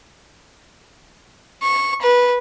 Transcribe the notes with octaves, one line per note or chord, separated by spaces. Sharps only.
C#6
B4